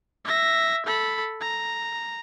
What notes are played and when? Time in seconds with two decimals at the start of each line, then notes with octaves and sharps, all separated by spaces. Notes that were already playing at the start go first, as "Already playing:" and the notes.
0.25 E5 A#6
0.86 A4 B5
1.40 A#5